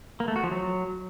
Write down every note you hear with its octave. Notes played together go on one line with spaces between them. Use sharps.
A#3
A3
F#4
F3
F#3